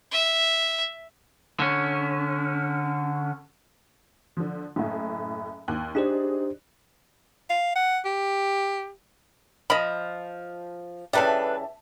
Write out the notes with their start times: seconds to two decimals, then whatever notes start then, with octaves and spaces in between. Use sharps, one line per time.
0.11 E5
1.60 D3 C#4
4.37 D3 F3
4.76 F#1 A2
5.68 D#2 F#6
5.95 D4 D#4 G4 G#4 C5 D5
7.50 F5
7.76 F#5
8.05 G4
9.70 F3 D#5 B5
11.13 C#3 E3 G3 D4 A4 B4 E5 A5